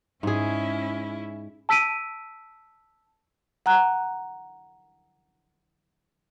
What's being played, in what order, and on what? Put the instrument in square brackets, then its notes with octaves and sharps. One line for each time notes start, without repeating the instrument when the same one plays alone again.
[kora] G#2 G#4 [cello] C#4 E4
[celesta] A5 E6 B6 D7 D#7
[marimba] F#5 A#5 F#6